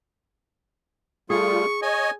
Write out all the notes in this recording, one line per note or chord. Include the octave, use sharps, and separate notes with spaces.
G3 A3 F4 G#4 C#6
C#5 D#5 G#5